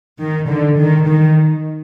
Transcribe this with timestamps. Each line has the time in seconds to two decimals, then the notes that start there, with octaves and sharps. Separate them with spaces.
0.19 D#3
0.48 D3
0.78 D#3
1.07 D#3